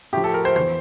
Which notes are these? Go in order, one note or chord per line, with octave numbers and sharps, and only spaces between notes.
A2 F3 G4
A4
A#4
C5
E2 E3 C5